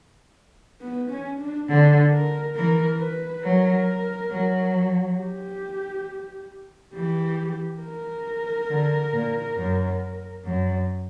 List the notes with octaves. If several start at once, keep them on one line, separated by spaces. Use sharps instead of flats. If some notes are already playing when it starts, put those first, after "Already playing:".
B3
C#4
D4
D3 D4
A#4
E3 A#4
B4
F#3 A#4
F#3
G4
E3 G4
A#4
D3
A#2
F#2
F#2